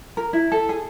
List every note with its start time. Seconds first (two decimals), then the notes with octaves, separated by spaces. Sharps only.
0.17 A#4
0.33 E4
0.52 A4
0.69 G#4